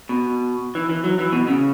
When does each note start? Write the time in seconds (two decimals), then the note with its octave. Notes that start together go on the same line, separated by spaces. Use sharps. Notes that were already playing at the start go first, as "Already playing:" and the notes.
0.09 B2
0.75 E3
0.89 E3
1.04 F#3
1.19 E3
1.32 B2
1.48 C#3